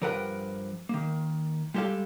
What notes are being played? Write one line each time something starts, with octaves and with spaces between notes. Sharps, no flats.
G2 F3 A#4 B4 F#5 G5
D#3 A#3
G3 G#3 G4 A4 F5